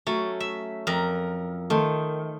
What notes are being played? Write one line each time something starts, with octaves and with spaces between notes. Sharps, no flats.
F#3 A3 C#4
E5
F2 A#4
D#3 A3 C5